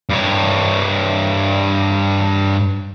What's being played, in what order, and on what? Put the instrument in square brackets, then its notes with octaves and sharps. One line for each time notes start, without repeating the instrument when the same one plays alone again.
[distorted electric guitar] G2 C#5